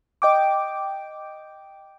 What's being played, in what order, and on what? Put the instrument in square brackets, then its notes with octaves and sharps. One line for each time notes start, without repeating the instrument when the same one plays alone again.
[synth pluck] D#5 G5 D6